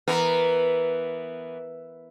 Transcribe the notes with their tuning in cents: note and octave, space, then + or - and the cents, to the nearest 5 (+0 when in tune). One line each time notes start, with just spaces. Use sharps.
E3 +0 B3 +0 A#4 +0